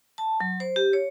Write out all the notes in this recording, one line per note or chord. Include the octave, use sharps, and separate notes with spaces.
A5
F#3
C5
G4
C#5